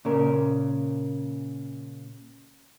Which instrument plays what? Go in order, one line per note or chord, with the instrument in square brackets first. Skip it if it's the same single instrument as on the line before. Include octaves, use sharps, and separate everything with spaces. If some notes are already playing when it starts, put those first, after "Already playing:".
[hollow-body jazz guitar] A#2 C#3 A#4